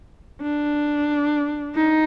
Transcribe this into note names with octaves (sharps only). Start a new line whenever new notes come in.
D4
D#4